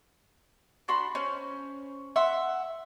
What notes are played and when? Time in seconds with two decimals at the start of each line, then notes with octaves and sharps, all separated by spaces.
0.88 D4 F#4 B5 C6
1.15 C#4 C5
2.16 E5 F#5 C6